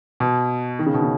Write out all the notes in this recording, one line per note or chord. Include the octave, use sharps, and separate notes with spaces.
B2
D#3
C#3
B2
C#3